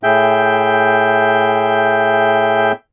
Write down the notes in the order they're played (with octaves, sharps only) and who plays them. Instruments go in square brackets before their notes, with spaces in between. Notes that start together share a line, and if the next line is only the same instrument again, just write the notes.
[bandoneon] A2 G#4 E5 G5 G6